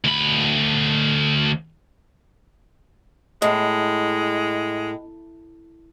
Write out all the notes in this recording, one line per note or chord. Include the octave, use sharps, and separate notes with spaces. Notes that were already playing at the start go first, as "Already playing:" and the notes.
D2 B5
A2 G#3 D#5